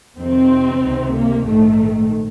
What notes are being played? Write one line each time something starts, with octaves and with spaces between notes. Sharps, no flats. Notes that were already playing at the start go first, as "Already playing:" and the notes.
F2 C3 D#3 C4
C#2 C3 D#3
A#3
A#1 G#2 D#3 A3